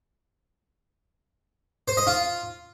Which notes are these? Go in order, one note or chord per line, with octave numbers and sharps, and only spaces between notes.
C5
D#5
F4